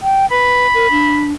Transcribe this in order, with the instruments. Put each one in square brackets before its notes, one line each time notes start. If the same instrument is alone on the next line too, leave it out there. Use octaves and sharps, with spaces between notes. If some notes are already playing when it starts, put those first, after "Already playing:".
[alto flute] G5
[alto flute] B4 [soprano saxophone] B5
[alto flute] A#4
D4